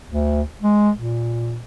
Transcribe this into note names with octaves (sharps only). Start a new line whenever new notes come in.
D2
G#3
A#2